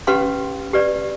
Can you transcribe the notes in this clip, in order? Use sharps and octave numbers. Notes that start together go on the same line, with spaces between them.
C#4 G4 B4 F5 C6
G4 B4 D5